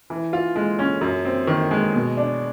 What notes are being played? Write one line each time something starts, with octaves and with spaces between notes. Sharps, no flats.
E3
F4
G#3
C#4
F#2
C4
D#3
G#3
B2
D4